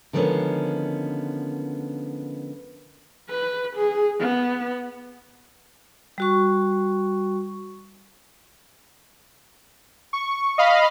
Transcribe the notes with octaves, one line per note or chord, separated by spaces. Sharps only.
D3 D#3 F3 G#3 B3 C#4
B4
G#4
B3
G3 F#4 C#6
C#6
D#5 F5 B5